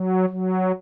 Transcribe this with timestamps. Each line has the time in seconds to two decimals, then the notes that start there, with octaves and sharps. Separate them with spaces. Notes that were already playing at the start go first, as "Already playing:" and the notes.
Already playing: F#3
0.29 F#3